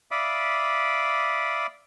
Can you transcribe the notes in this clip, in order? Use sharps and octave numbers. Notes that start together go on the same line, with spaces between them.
D5 E5 F5 B5 D6 D#6